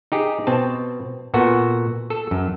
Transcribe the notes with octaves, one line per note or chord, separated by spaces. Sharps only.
D#4 G4 G#4
B2 C4 A5
A#2 B3 F#4 A4
A4
F#2